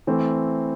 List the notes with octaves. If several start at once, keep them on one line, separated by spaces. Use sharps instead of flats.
E3 A3 C4